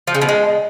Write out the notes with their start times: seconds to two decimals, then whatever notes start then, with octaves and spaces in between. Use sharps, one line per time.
0.07 F3
0.14 C#3
0.22 B2
0.29 G#3